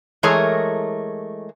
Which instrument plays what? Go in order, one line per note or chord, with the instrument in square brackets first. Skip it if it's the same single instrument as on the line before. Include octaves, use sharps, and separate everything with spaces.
[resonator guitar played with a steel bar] E3 G#3 A3 G#4 A#4 C#5